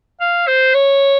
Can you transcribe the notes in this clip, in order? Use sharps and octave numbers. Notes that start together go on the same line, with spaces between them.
F5
C5
C#5